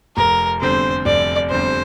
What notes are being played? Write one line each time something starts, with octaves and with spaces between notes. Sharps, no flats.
F1 A#4
E2 D3 G3 C4 C5
F1 D5
E2 D3 G3 C4 C5